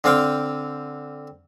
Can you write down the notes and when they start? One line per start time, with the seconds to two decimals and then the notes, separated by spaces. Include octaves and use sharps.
0.04 D3 C4 D5 F5 G5